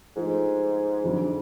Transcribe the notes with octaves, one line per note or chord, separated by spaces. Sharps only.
G#2 F3 A3 F4
F2 D3 F#3